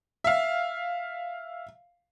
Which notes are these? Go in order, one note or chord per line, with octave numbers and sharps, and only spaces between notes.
E5 F5